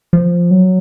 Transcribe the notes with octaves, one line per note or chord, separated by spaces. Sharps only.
F3
F#3